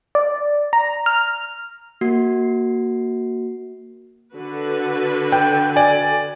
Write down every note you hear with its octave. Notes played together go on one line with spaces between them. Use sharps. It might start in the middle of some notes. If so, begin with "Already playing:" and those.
D5
A#5
F6
A#3 F#4 C7
D3 F#4 B4
G5
D5 G#5